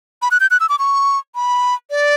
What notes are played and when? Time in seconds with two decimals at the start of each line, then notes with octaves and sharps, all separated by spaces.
0.22 B5
0.31 F#6
0.40 G6
0.51 F#6
0.60 E6
0.69 D6
0.79 C#6
1.35 B5
1.90 D5